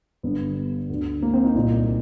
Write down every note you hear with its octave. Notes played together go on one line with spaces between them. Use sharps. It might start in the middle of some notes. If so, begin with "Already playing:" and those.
G1 G2 D3 B3
D2 D3
A#3
C4
D#4
C2 A#2 D#4